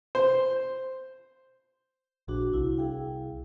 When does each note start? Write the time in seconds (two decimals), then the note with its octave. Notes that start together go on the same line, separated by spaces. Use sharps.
0.15 C5
2.28 A#1 D4 F#4 G#4
2.53 C2 E4
2.78 G#4 F5 G5